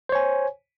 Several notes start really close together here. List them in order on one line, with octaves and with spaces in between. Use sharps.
C5 C#5 G#5